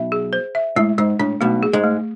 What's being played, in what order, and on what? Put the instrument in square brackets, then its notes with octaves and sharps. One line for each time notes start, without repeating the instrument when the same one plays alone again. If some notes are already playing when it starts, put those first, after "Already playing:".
Already playing: [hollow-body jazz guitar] B1 B2 [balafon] E5
[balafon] G#4
C5
E5
[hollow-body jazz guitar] A2 [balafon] G#3
[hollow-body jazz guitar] G#2 [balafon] G#3
[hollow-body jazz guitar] A2 [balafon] D4
[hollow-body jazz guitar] B1 B2 [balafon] A3
[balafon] G#4
[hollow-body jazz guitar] G#2 G#3
[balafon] A3